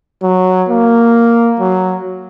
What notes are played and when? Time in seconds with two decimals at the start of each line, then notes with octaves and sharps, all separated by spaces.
0.23 F#3
0.69 A#3
1.60 F#3